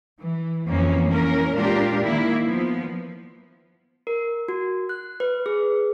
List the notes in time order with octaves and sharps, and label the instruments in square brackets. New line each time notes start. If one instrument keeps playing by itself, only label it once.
[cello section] E3
F2 E3 A#3 C#4
E3 A#3 C#4 A#4
A#2 G#3 D4 F4 G4 A#4
D#3 A#3 E4
F3 B3
[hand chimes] A#4
F#4
F#6
B4
G#4